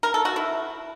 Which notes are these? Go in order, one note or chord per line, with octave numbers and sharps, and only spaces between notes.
A#4
A4
F#4
E4